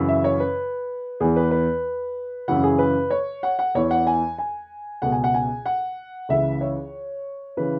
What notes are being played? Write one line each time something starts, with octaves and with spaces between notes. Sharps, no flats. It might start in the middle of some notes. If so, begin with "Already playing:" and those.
Already playing: F#2 C#3 E3
E5
C#5
B4
E2 E3 G#4
B4
B4
F#2 C#3 E3 F#5
G#4
B4
C#5
F#5
F#5
E2 E3 C#5
F#5
G#5
G#5
C#2 B2 F#5
G#5
F#5
G#5
F#5
C#2 C#3 E3 E5
C#5
C#3 E3 B4